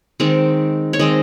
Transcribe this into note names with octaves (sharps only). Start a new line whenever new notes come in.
D#3 G#3 C4
C#5
D#3 G#3 C4 D#5